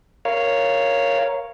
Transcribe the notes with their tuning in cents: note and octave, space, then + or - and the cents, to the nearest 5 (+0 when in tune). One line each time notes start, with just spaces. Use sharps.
A#4 +5 C#5 +0 F5 -15